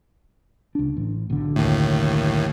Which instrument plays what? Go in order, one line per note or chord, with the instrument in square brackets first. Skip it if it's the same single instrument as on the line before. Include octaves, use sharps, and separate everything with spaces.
[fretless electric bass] C#2 D4
A1
B1 D3
[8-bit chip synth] D#2 A2